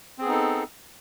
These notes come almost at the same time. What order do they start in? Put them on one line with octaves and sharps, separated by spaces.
C4 G#4 B3 D#4 A4